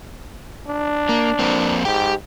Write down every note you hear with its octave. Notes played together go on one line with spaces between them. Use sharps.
D4
A#3
F2 A#3 C4
G#2 G4 G5